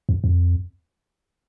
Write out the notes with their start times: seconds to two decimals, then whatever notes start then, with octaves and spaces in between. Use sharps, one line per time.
0.09 F2
0.24 F2